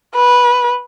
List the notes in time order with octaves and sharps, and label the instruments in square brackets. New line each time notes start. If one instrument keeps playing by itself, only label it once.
[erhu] B4